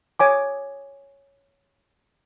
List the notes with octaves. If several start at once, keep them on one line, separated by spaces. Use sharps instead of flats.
C#5 G#5 D6